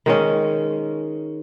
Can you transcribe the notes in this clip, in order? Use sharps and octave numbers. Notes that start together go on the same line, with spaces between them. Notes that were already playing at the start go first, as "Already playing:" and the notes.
D#3 G#3 C#4